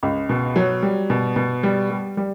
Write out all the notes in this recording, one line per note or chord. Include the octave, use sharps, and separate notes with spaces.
C#2
B2
F#3
G3
B2
B2
G3
G3
G3